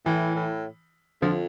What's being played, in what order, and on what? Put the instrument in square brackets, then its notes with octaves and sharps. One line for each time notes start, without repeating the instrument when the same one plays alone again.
[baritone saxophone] A2 [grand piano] E3
[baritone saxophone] A2
[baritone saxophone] F2 [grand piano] D3 F3